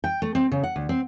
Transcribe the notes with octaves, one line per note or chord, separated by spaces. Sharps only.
G5
A3
C4
C#3
F#5
D2
C4